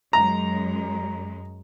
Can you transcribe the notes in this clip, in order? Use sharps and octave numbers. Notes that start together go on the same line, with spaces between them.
F#2 G#3 A#5